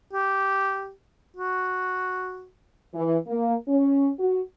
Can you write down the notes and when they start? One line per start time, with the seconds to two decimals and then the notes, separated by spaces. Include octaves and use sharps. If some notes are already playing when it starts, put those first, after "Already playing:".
0.13 G4
1.37 F#4
2.94 E3
3.27 A#3
3.68 C#4
4.19 F#4